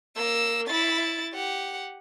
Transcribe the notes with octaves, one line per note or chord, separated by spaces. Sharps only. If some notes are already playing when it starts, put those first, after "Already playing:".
A#3 E6
E4 A6
G4 F#5